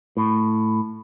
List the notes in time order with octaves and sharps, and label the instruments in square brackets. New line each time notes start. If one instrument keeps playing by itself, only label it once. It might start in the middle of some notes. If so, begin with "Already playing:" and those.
[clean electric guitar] A2